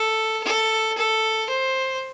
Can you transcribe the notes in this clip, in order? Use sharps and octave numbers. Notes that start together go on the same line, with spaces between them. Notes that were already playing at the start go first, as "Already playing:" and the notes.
Already playing: A4
A4
A4
C5